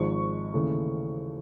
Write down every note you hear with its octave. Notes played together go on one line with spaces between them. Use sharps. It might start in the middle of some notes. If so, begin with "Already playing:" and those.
Already playing: G#1 G#2 F3 G#3 C#6
D#2 C#3 E3 A3